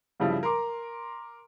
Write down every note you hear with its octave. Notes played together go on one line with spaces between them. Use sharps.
G2 C#3 F3 G3 E4
A#4 A#5 C6 D6